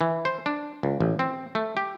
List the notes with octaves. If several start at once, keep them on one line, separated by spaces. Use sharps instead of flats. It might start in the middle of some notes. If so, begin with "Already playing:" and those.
E3
C5
D4
C#2
A1
C4
A3
G4